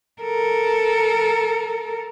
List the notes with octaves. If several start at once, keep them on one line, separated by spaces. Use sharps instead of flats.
A4 A#4